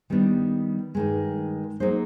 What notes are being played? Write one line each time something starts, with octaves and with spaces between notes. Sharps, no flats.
D#3 G3 B3 D4
G2 D#3 G#3
F#3 A#3 D#4 G#4 C5